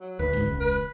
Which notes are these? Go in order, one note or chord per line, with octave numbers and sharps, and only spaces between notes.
F#3
D2 B4
D2 G#2
E1 C#2
B4